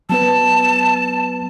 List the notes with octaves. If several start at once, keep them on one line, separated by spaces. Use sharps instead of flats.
F#3 B3 B4 A5